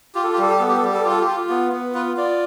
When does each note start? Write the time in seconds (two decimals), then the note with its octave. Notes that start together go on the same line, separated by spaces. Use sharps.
0.15 F4 G4
0.24 A4
0.33 G4
0.38 G3 A4
0.50 G4
0.58 B3 A4
0.68 G4
0.76 A4
0.83 G3 G4
0.94 A4
1.03 F4 G4
1.11 A4
1.21 G4
1.27 F4
1.49 B3
1.72 B3
1.94 F4 B4
2.17 F4 D5